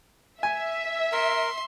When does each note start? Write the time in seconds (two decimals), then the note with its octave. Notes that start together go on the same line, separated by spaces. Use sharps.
0.43 E5 G#5
1.12 A#4 C6